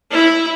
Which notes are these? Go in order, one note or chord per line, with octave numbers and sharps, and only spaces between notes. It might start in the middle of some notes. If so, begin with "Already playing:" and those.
E4